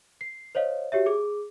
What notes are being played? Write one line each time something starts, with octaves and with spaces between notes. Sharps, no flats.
C7
C5 C#5 D#5 F5
F#4 G4 C#5 E5
G#4 D6